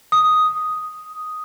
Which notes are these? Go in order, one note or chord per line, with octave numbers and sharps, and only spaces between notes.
D#6